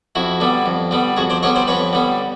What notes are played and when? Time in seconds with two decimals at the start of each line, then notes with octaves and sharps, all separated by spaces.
0.15 F2 E4 F#4
0.40 D3 G3 B3
0.66 F2
0.91 D3 G3 B3
1.17 F2 F#4 G#4
1.30 C5 D5
1.43 D3 G3 B3 C#5 D#5
1.56 C5 D5
1.68 F2 B4 C#5
1.93 D3 G3 B3